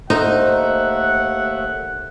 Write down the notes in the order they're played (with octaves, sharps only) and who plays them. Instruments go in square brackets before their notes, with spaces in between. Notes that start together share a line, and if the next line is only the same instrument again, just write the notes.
[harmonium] D#2 A3 E5 [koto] D#4 [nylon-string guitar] C5 [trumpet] F#5